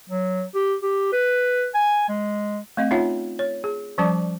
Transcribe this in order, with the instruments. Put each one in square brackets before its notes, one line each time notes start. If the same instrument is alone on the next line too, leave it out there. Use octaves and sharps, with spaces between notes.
[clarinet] F#3
G4
G4
B4
G#5
G#3
[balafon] A3 C4 D#5 F5
C#4 D#4 F4 C#5 E5 F#5
C#5
G#4
F3 G3 C#4 D5 A5 D6